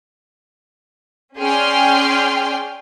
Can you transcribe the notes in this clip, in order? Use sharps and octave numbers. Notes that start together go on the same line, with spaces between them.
C#4 G#4 D5 G5 C6 F6